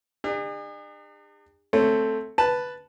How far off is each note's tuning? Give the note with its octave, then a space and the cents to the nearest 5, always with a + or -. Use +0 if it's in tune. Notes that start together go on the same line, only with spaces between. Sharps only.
D4 +45 G#4 -45
A3 +0 C4 +0 C#5 +0
B4 +0 A5 +0